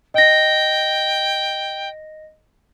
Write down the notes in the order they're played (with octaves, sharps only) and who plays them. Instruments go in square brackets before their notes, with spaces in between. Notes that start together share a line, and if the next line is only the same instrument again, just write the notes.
[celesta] D#5 A#6 [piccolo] G5